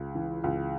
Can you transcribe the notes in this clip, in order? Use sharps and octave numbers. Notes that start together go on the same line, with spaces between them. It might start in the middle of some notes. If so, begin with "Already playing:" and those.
Already playing: C#2
E3
C#2